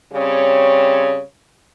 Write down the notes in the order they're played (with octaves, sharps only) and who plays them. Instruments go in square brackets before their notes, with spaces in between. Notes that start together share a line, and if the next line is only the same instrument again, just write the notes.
[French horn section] C#3 G3 C4 C#5